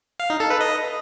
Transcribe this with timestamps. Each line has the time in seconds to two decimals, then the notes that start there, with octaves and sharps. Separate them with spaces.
0.20 F5
0.30 D#4
0.40 A4
0.50 B4
0.61 D#5